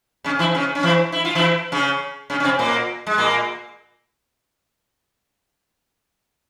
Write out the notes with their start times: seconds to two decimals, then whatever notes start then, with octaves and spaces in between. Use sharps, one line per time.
0.24 C#3 C#4
0.39 E3 E4
0.54 C#3 C#4
0.75 C#4
0.83 E3 E4
1.12 E4
1.25 F4
1.35 E3 E4
1.72 C#3 C#4
2.30 C#3 C#4
2.40 C#4
2.44 C3 C4
2.59 A#2 A#3
3.07 G#3
3.18 A#2 A#3